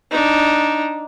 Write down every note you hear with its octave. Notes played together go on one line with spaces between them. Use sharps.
D4 D#4